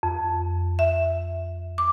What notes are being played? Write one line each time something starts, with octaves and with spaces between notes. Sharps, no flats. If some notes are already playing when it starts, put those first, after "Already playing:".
F2
E5
D6